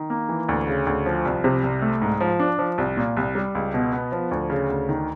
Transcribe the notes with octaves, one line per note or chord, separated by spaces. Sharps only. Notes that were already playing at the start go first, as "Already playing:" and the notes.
Already playing: D#3
A#3
E3
D2
C#3
D2
F3
C2
C3
C2
A3
G#2
F3
D4
F3
C2
A#2
C2
G3
C#2
B2
B3
F3
D2
C#3
D2
D#3